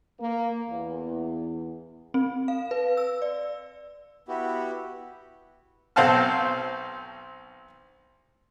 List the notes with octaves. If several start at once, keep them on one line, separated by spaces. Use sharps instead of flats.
A#3
E2
C4
F5
B4
E6
D5
B3 E4 F#4 G4
B1 C4 F5 F#5 A5 F6